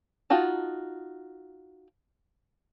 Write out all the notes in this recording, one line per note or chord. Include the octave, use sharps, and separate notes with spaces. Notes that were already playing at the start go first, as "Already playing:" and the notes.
D#4 F4 F#4 A5